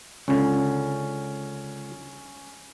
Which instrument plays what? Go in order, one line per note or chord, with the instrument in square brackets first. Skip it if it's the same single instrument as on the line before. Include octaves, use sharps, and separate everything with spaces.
[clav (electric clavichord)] C#2 D3 [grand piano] C#4